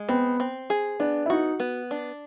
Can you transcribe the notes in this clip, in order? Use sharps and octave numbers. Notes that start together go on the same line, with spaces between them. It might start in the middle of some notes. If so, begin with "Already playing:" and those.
Already playing: G#3
B3 C4
C4
G#4
B3 D4
E4
D#4 F#4
B3
D4